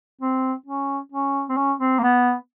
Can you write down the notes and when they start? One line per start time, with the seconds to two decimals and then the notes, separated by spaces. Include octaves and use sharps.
0.21 C4
0.67 C#4
1.12 C#4
1.49 C4
1.57 C#4
1.80 C4
1.99 A#3
2.03 B3